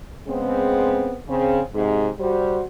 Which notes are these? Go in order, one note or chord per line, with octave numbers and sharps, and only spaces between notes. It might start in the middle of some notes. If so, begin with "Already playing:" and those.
C#3 G#3 B3 C4
C#3 C4
G#2 C3
G3 F#4 C5